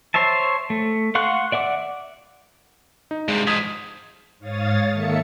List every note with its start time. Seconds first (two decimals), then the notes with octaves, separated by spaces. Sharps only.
0.14 C5 C#5 E5 A5
0.70 A3
1.15 F5 F#5 C6 C#6 F#6
1.52 D5 E5 F#5 D6
3.11 D#4
3.28 G2 C3 G#3
3.47 G#2 F3 D#6 G#6 B6
4.39 G#2 C#5 F5 D#6 A6
4.91 D#3 A#3 A4 E5 C#7